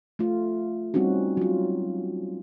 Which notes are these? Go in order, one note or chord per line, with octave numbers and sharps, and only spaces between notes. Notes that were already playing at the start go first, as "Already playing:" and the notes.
A3 F4
G3 C4 C#4 D#4 F#4
F#3 F4